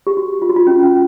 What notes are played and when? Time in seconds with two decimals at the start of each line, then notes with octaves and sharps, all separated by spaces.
0.07 G4
0.17 F#4
0.42 F4
0.49 F#4
0.56 F4
0.67 C#4
0.83 C#4